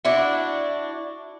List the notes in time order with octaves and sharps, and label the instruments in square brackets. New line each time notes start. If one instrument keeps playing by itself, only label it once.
[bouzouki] D4 E4 F#4